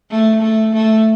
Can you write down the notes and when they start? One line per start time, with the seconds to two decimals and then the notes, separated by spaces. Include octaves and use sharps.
0.11 A3
0.42 A3
0.73 A3